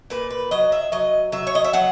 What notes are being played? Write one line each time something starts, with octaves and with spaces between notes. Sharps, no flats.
A#2 B4
B4
F#3 D#5
E5
F#3 D#5
F#3 E5
C#5
D#5
E5
F#3 F#5